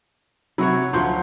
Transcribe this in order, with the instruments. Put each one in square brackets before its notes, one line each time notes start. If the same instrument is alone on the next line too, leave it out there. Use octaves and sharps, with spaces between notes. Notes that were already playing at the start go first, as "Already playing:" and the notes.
[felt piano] C3 F#3 [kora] E4 F#4 C#5
[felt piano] D2 C6 G6 [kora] F3 F#3